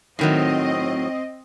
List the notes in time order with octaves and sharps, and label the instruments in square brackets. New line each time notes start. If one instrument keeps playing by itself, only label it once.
[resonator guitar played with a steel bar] A2 D#3 F#3 [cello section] C4 D#5